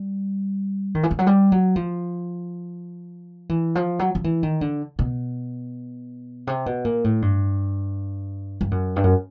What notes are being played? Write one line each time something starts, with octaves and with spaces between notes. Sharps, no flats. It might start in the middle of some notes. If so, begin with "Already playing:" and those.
Already playing: G3
D#3
E3
F3
F#3
G3
F#3
F3
E3
F3
F#3
F3
E3
D#3
D3
B2
C3
B2
A#2
A2
G2
G2
F#2
G2
F#2